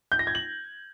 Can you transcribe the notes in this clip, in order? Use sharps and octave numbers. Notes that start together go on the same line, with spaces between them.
G6
A#6
G#6
F#7